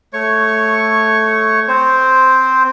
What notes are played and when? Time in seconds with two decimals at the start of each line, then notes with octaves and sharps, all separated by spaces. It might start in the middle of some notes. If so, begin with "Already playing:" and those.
0.13 A3 C#5 C#6
1.68 C4 C5